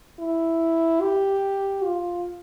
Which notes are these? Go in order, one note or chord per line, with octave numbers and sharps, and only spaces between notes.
E4
G4
F4